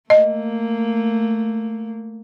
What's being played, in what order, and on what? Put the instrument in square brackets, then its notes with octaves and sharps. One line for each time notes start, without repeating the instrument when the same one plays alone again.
[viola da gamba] A3 A#3 [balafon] D#5